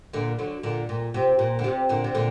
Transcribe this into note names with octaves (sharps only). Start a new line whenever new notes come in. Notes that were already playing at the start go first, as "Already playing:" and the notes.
A#2 D3
D3 F#3
A#2 D3
A#2
C3
A#2
D3
C3
A#2 D3
C3
A#2 D3